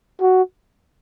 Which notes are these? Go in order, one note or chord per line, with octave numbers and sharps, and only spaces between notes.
F#4